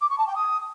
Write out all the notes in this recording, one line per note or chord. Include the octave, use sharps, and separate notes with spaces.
D6
C#6
A5
G5
D#6